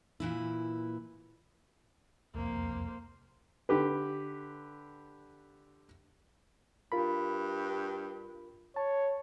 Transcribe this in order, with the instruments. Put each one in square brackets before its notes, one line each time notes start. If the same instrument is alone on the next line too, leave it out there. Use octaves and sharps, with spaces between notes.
[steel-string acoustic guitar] A#2 E3 E4
[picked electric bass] E1 C2 F2 [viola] A#3 C5
[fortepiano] D3 G4 B4
[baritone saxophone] G2 [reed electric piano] F4 A#4 B5
[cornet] C#5 [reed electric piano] A5